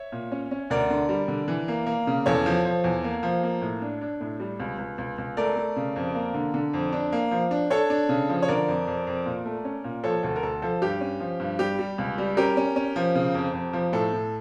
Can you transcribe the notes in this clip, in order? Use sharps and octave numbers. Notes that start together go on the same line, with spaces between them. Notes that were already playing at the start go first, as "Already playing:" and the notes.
Already playing: C#5 E5
A#2
C#4
C#4
D2 A#4 D5
D3
G3
D3
E3
A#3
A#3
C#3
E2 A4 C#5
F3
F3
E2
A#3
F3
A#3
A2
D4
D4
A2
G3
C#2
C#2
C#2
C#2
A3 A#4 D5
A3
C#3
F2
A#3
D3
D3
F2
D4
A#3
F3
D4
D4 A4 C#5
D4
C#3
F3
C#5
D3 A#4 D5
F2
F2
F2
A#2
A3
C#4
A#2
F3 A4 C#5
D2 A4
A#4
D2 A4
F3 A4
G2 G4
C#4
F3
G2
G3 G4
G3
C#2
G3
C#4 G4 A#4
C#4
C#4
F3
C#3
F2
F2
F3
A2 A4
A2